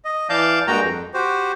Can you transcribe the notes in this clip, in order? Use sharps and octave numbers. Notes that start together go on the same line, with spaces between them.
D#5
E3 D5 F5 A5 G6
G2 G#3 A#3 F#4 G5 A#5
F2
F#4 G4 C5